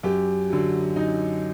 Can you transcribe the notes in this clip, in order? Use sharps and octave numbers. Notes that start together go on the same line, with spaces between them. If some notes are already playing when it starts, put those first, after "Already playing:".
F#2 G4
D3 F#3
F#2 D#4